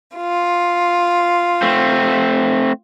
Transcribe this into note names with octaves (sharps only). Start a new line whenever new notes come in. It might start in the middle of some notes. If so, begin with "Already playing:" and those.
F4
A3 C4